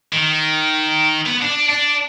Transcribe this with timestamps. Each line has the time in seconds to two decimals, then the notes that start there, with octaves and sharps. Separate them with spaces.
0.13 D#3
1.26 B3
1.42 D4
1.69 D4